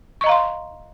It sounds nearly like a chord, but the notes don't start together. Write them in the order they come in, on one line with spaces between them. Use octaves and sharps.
C#6 D#5 A#5 F5 C6